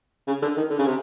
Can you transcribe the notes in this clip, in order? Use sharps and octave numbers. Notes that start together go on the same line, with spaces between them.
C#3
D3
D#3
D3
C#3
C3